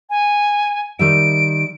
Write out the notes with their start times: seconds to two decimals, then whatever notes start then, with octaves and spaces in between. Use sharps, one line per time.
0.10 G#5
0.99 D#3 G3 E5 D7